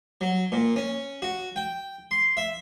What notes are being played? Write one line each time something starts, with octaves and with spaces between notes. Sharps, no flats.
F#3
A#2
C#4
F#4
G5
C6
E5